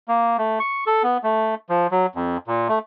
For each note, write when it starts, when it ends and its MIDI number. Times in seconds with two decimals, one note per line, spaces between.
0.08 0.37 58
0.38 0.59 57
0.60 0.84 85
0.87 1.03 69
1.03 1.18 59
1.23 1.55 57
1.69 1.87 53
1.91 2.06 54
2.15 2.37 41
2.47 2.68 46
2.69 2.79 57